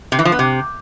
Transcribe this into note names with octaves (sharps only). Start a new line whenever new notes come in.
C3
E3
F3
B3
C3